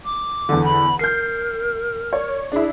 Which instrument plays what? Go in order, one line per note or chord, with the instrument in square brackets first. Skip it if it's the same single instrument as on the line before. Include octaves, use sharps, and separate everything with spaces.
[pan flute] D6
[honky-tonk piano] E2 D3
[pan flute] B5
[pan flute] A#4 [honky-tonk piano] G6 C7
[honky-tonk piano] C#5 D5
[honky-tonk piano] D4 E4 [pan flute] G#4